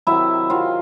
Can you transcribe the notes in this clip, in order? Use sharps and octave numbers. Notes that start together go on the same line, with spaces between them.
C3 D#3 F#3 E4 E5
C3 D#3 F#3 F4 F5